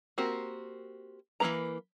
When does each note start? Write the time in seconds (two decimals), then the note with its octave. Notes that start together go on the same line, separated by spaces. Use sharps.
0.18 A#3 C4 F#4 G4 A#4
1.40 E3 A3 A#3 B4 A#5